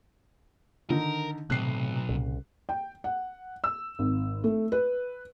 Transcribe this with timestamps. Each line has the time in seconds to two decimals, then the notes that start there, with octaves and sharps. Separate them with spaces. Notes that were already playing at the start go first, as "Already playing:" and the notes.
0.90 D3 D#3 D#4 A#4
1.50 B1 A2 C3 F#6 C7
2.09 C2 A#2 C#3
2.69 G5
3.04 F#5
3.64 E6
3.99 G#1
4.44 A3
4.72 B4